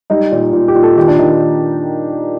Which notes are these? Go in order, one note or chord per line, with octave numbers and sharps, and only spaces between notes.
G3 D#4
A#2
A#2
G4
A#2
A4
D#3 G4
D4
D#3 D#4